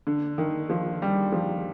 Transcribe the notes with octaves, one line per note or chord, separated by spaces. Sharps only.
D3
D#3
F3
G3
F3